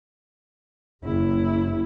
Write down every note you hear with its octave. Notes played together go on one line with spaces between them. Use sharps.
F#1 E4